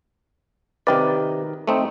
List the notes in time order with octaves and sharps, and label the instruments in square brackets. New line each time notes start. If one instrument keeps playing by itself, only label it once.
[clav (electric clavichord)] C3 D5 [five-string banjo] D#3 B4
[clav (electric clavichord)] A3 C4 D#4